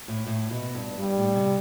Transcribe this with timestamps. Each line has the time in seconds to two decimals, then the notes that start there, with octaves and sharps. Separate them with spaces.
0.08 A2
0.27 A2
0.51 B2
0.75 G2
0.99 G2 G3
1.17 A2
1.35 C3